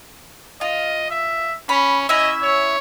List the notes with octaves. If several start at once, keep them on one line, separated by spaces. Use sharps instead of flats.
F4 D#5
E5
C#4 B5
C#4 E4 D#5 E5
C#5